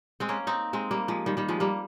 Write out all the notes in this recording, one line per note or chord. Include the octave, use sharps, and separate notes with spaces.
G#3 C4
A#3 C#4
C4 D#4
G#3 C4
G3 A#3
F3 G#3
D#3 G3
D#3 G3
F3 G#3
G3 A#3